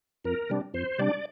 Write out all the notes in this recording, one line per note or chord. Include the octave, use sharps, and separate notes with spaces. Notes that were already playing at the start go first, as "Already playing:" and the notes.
F2 A#4
C3 G3 D4
F2 C5
C3 G3 D4 D5